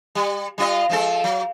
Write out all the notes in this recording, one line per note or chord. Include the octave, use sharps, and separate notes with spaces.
G3
G3 F4 D#5
F3 G#3 A4
F#3